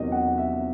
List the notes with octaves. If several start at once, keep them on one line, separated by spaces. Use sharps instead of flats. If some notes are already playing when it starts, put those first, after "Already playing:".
Already playing: E2 C3 D#3 F#3 C#4 D#5
F#5
E5